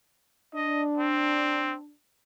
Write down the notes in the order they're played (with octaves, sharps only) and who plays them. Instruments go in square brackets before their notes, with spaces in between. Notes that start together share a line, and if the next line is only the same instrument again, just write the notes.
[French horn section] D4 [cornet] D#5
[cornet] C4